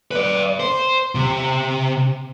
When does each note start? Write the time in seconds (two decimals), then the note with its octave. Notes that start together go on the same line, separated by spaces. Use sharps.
0.11 B4 D5
0.60 C5
1.15 C3